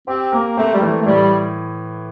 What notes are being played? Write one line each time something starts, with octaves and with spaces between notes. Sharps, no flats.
C4 G4
A#3 A#4
A3 C4
G3
E3 A3
A3
A2 G3